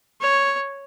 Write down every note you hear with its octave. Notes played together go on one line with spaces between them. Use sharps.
C#5